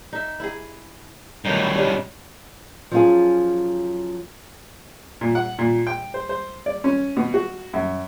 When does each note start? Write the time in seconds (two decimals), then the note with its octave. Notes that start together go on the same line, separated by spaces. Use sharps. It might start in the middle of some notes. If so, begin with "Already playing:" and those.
0.13 D#4 E5
0.40 E4 G#4
1.45 G2 B2 D#3 F#3 D#4
1.75 C#3 G3 G#3
2.91 F3 F#3 B3 C#4 F4 G#4
5.21 A#2
5.35 F#5
5.59 A#2
5.87 G5
6.14 C5
6.29 C5
6.66 D5
6.84 C#4
7.17 B2
7.34 F#4
7.73 F#2